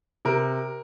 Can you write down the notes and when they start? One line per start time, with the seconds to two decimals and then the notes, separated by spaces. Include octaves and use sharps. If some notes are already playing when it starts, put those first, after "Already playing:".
0.25 C3 A#4